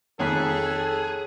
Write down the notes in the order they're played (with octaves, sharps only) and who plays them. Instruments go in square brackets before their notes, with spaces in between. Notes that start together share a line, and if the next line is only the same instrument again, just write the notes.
[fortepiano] F2 D#3 [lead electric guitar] G#4 [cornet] A4 [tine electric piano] C#5 F#6 B6